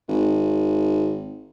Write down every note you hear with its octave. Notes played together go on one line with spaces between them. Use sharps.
G#1